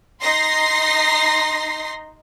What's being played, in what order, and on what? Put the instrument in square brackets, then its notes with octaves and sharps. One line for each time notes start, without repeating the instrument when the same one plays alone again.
[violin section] D#4 C6 A#6 C7